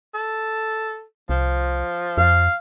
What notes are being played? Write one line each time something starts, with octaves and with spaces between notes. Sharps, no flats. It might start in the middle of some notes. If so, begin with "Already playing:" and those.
A4
C2 F3
F2 F5